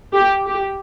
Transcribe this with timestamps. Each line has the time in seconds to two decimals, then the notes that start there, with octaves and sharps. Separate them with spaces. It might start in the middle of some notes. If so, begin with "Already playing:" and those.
0.13 G4
0.47 G4